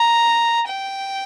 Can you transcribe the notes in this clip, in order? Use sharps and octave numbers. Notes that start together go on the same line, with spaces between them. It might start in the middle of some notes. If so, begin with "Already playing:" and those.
Already playing: A#5
G5